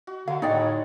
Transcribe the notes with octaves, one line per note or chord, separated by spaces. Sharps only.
F#4
D3 F#3 F5
A2 G#3 D#4 C#5 D5 F#5 G5